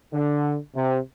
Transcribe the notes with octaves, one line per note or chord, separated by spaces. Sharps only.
D3
C3